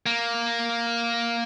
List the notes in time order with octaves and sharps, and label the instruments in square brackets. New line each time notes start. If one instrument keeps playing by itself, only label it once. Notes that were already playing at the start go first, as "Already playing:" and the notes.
[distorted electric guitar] A#3